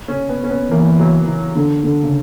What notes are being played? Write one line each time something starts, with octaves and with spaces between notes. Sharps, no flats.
C#4
B3
C#4
B3
E3 A#3
F#3
E3
D3
D3
C#3